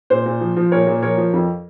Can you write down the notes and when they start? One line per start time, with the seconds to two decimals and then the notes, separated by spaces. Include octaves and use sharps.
0.10 A#2 C5
0.26 A#2
0.41 F3
0.56 F3
0.72 A#2 A#4 C#5
0.87 A#2
1.02 F3 A#4 C#5
1.18 F3
1.33 F2